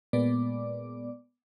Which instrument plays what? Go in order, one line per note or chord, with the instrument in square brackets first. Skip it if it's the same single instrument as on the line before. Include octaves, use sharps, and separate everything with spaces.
[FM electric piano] A#2 G#3 B3 D5 D6